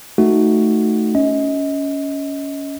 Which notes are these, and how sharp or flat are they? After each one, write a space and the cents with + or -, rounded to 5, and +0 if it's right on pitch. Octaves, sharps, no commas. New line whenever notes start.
A3 +0 D#4 +0 F#4 +0
C#4 +15 D#5 +30